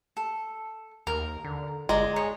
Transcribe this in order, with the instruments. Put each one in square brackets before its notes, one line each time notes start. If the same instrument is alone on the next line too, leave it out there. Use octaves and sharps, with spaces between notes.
[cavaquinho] A4
[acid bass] D#2 [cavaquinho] A#4
[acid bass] D3
[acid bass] G1 [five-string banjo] G#3 [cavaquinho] D5 A#5
[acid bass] G#4 [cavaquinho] C#5